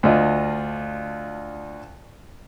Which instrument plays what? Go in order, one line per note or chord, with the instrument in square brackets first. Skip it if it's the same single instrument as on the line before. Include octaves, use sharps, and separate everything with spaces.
[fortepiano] D2 D4 F4 D#5